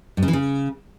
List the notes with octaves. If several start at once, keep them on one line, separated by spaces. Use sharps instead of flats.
G2
C#3
E3
C#3